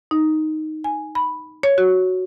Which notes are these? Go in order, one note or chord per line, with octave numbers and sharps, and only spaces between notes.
D#4
G#5
B5
C#5
F#4